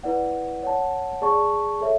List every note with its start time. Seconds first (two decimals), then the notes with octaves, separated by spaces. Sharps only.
0.03 E4 B4 D5 F#5
0.63 C#5 F#5 A5
1.22 G#4 D5 A5 C#6
1.81 A4 C#5 E5